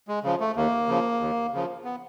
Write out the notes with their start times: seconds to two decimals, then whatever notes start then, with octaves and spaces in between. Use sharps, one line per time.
0.08 G#3
0.24 C#3 F3
0.40 A3
0.56 D#2 A#3
0.88 C#3 F3
1.20 D#2
1.53 C#3 F3
1.84 B3